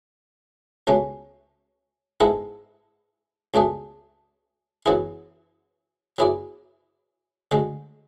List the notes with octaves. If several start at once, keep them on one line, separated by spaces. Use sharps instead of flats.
C#2 B2 A3 C#4
G#2 G#3 B3 E4 A4
C#2 B2 A3 D4 G#4
F#2 E3 B3 E4 G#4
F#3 B3 E4 G#4 D5
D2 D3 G#3